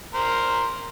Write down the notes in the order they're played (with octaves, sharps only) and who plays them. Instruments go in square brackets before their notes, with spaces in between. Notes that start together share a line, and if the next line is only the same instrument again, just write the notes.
[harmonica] A#4 C5